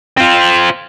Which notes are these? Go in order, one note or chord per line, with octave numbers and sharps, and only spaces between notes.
C4 F4